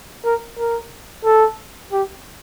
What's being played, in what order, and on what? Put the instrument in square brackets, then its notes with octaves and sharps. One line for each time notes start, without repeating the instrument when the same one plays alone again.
[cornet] A#4
A#4
A4
G4